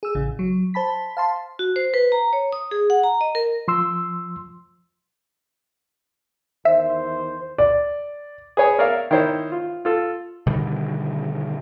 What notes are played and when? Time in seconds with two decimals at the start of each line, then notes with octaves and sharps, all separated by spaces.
0.03 G#4 E6
0.15 A1 C#3
0.39 F#3
0.74 C5 A5 B5 B6
1.17 F5 A5 C6
1.59 F#4
1.76 C5
1.94 B4
2.12 A#5
2.33 C#5
2.53 D#6
2.71 G#4
2.90 F#5
3.04 A#5
3.21 D#5
3.35 A#4
3.68 F3 C6 E6
6.65 E2 D#3 C5 E5
7.58 D5
8.57 G#4 B4 C#5 G#5
8.79 A#4 C#5 D5 E5 F5
9.11 D#3 E4 C5 C#5
9.52 F4
9.85 F4 A4
10.47 B2 D3 D#3 G3